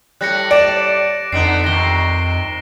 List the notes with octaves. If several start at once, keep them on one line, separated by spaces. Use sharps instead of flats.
A2 G3 F#6 A#6 C#7
D5 D7 E7
F2 D3 B3 D#4 C7 D7
C3 D#3 A#6 G7